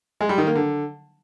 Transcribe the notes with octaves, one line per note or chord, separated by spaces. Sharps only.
G#3
G3
D#3
A#3
D3